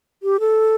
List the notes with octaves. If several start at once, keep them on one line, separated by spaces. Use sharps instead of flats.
G4
A4